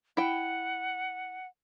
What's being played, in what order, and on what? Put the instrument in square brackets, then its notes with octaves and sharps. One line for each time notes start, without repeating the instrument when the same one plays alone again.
[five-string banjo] E4 G5 [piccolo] F#5